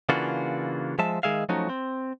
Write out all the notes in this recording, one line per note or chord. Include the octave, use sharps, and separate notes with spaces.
C#3 E3 A#3 D4 F4 F#4
F3 G#3 E5 A5
D#3 G#3 G#4 E5 F5
F3 F#3 A3 C#4 D#4 F#4
C4